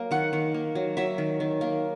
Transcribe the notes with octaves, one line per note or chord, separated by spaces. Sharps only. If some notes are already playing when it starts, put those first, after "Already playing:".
Already playing: F#3 A#3
D#3 F#5
D#3
A#3
F#3
F#3 E5
D#3
D#3
A#3